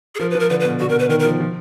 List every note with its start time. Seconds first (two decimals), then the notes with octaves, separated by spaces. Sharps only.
0.15 G#4
0.20 F3 A#4
0.31 B4
0.35 F3 A#4
0.50 D3 B4
0.60 B4
0.65 B2
0.79 D3 F#4
0.89 B2 A#4
0.99 B4
1.09 D#3 A#4
1.20 A#4
1.25 F3
1.40 F3